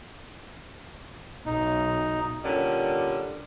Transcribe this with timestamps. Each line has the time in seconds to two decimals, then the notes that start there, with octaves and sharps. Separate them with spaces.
1.46 B1 D#4
2.44 A#2 D3 G3 C#4